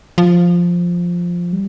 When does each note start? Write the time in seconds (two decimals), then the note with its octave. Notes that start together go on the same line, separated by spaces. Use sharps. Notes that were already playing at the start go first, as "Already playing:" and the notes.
0.18 F3
1.53 G3